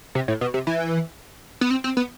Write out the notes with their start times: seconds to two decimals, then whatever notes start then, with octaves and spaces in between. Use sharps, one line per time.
0.15 C3
0.28 A2
0.41 B2
0.54 C3
0.67 E3
1.61 B3
1.71 C4
1.84 C4
1.97 B3